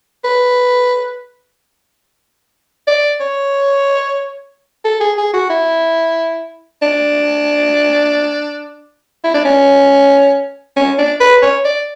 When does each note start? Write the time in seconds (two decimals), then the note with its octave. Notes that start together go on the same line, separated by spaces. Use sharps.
0.24 B4
2.87 D5
3.20 C#5
4.84 A4
5.00 G#4
5.17 G#4
5.34 F#4
5.50 E4
6.82 D4
9.24 E4
9.34 D4
9.45 C#4
10.76 C#4
10.98 D4
11.20 B4
11.42 C#5
11.65 D5